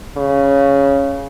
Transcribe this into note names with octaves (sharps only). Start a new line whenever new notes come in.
C#3